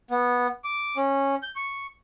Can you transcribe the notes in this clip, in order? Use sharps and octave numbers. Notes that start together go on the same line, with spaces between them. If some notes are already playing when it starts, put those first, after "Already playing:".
B3
D6
C#4
G6
C#6